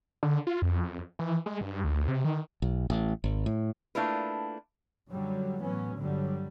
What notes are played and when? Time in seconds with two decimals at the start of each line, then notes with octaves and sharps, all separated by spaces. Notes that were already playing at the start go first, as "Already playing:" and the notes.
0.23 D3
0.47 F4
0.62 F2
1.19 E3
1.46 G#3
1.61 G2
1.84 D2
2.08 C3
2.24 D#3
2.62 B1
2.90 A1
3.24 G#1
3.46 A2
3.95 A3 A#3 D4 E4 F4 B4
5.09 F#2 D3 F#3 G3
5.61 A2 E3 F#3 B3 C#4
5.96 G1 G2 D3 F#3 G3